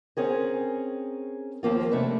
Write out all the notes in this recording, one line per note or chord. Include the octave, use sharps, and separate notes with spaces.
C4 C#4 G#4 A#4
D#2 F3 A#3 F4
C3 A3 C#4 D4 B4